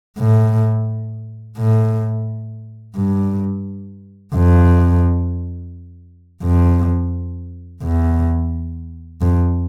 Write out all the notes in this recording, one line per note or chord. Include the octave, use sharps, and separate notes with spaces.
A2
A2
G2
F2
F2
E2
F2